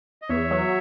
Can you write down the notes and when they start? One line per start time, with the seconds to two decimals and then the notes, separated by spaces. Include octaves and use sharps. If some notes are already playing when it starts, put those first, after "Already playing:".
0.22 D#5
0.29 E2 C#5 E5
0.51 F#3